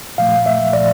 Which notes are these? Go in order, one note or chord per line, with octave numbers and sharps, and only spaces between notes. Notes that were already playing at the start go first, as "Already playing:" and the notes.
A#2 F3 A3 F5
E5
A#2 F3 A3 D5